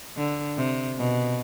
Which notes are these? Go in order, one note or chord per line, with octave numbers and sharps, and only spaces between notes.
D3
C3
B2